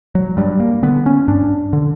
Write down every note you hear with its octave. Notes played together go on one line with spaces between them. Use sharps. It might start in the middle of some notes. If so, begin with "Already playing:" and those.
F#3
G2 G3
A#3
D3 B3
C#4
G2 D4
D3